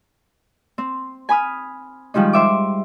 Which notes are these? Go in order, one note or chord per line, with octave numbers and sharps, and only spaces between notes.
C4
G#5 B5 D#6 F6
D#3 F3 G3 G#3 D#4
C5 E5 D6